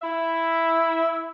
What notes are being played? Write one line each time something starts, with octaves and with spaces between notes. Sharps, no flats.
E4 E5